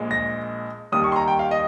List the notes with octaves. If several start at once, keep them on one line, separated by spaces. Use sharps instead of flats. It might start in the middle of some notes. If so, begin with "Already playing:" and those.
Already playing: A#1 A#2 G#3
A#6
D#2 D#3 G3 D#6
C#6
C6
A#5
G5
F5
D#5